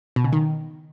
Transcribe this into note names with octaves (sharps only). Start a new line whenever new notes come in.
B2
C#3
D#3